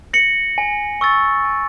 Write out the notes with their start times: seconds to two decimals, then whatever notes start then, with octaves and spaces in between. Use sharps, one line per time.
0.13 A#6 C#7 F#7
0.58 G#5
1.01 C#6 E6 A6
1.44 G#5